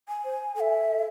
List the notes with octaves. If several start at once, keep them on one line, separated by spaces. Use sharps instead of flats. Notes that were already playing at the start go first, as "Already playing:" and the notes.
G#5
C5
A4 E5 G#5